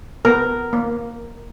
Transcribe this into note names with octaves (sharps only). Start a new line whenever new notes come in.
B3 A#4
A#3